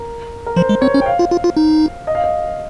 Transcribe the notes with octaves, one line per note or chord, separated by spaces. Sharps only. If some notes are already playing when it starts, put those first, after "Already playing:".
Already playing: A#4
A#4
F3 C5
G#3
C4 C#5
C#4
G5
F5
F4
F4
F4
D#4
D#5
F5
D#5